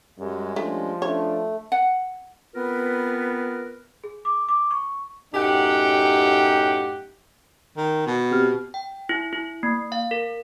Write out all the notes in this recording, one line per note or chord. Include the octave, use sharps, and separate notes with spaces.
F#2 G3 G#3
F3 G3 A3 C#4 D4
A3 C#4 D4 C#5
F#5
B3 C4 F4 A#4 B4
G#4
D6
D6
C#6
F#2 A2 D#4 G4 F#5 G5
D#3
B2
C4 G4 F6
G5
E4
E4
A#3
F5
A#4